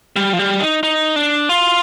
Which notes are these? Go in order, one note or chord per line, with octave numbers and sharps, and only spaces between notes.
G3
F3
G3
D#4
D#4
D4
F4